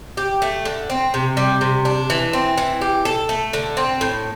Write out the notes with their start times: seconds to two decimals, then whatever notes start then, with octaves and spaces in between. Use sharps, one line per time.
0.17 G4
0.42 A3
0.65 D3
0.90 C4
1.14 C3
1.37 G3
1.61 C3
1.85 D4
2.10 E3
2.33 C4
2.58 E3
2.81 G4
3.05 A4
3.29 A3
3.53 D3
3.77 C4
4.01 A2